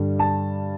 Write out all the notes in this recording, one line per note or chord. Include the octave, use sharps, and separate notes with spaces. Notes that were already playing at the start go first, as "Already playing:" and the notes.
Already playing: G2 D3 G3
A5